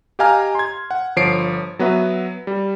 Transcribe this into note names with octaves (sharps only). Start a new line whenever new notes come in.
G4 D#5 F5 G#5 A#5 F6
C6 G#6
F#5
G1 F3 C#5 C7 D7
F#3 B3 F#4 B4 E5
G3